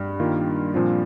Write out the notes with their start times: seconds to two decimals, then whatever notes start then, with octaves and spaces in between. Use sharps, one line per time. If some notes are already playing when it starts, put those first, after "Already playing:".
Already playing: G2
0.20 D#3 A#3 F4
0.74 A#2 F3 C4 F4